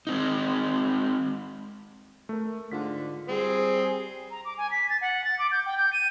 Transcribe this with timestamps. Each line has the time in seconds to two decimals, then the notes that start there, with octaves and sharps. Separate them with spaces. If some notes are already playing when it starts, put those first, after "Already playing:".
0.07 G#3 C4 D#4
2.29 A3 A#4
2.71 G#2 D3 F4 B6
3.28 G3 C4 G#4
4.31 A#5
4.45 D6
4.58 G#5
4.71 B6
4.90 A6
5.01 F#5
5.24 A6
5.39 D6
5.52 G6
5.66 G5
5.78 G6
5.93 D#7